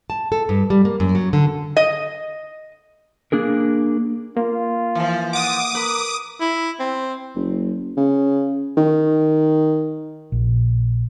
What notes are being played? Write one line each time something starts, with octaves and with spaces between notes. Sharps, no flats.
A5
A4
G2
G3
A#3
F#2
F#3
D3
D#5
A#3 D4 G#4 A#4
A#3 F4
E3 F3
F#5 D6 D#6
A#4 B4
E4
C4
F#1
C#3
D#3
A#1